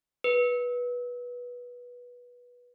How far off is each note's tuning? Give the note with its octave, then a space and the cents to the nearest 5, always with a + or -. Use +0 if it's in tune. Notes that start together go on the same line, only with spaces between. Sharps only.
B4 -15